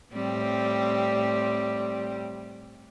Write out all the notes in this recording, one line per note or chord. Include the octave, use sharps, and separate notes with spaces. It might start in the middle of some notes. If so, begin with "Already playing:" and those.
A2 G3 C4